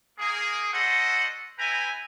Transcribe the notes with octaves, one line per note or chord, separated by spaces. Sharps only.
A#3 G#4
D4 F#4 A4 C5 D#5 F#5
E4 B4 E5 G5 G#5 A#5